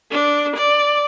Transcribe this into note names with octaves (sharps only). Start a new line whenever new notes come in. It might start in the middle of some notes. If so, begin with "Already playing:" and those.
D4
D5